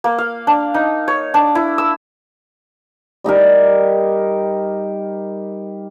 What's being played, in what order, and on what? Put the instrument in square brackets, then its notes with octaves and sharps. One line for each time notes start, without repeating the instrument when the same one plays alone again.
[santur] A#3
F5
D4
D#4
C#5
D4
E4
E6
[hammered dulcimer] G3 D#4 G4 A#4